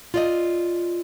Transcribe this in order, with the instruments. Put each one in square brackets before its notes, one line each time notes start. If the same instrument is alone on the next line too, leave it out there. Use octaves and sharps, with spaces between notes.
[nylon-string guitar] F4 D5 D#5